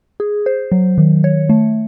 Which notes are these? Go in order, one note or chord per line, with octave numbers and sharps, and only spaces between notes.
G#4
C5
F#3
D#3
C#5
A3